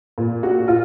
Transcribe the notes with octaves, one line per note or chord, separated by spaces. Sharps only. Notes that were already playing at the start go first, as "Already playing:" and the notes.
A#2
F#4
F4